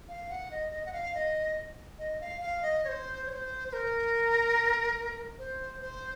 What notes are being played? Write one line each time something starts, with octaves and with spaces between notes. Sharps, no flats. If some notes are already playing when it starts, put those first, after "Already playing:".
F5
F#5
D#5
D#5
F#5
F5
D#5
D#5
F5
F5
D#5
C#5
C5
C#5
C5
C5
A#4
C5
C5